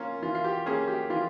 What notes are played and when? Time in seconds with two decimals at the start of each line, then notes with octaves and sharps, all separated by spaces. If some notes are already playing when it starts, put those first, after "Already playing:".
Already playing: A#3 C#4 F4
0.22 E3 F4
0.35 F4
0.44 G4
0.66 A#3 C#4 G#4
0.87 G4
1.10 E3 F4